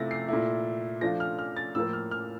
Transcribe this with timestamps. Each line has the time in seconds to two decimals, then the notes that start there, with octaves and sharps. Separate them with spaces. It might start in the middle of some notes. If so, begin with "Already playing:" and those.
Already playing: C3 F3 A3 E4 A6 A#6
0.11 C7
0.28 A#2 A3 E4
1.01 F3 A3 D4 F4 A#6
1.20 F6
1.39 F6
1.57 A6
1.75 A2 F3 A#3 E6
1.93 F6
2.11 F6